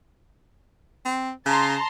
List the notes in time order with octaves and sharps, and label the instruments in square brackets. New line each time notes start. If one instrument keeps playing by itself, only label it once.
[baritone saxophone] C4
[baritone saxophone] C#3 [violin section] A5 A#5 C6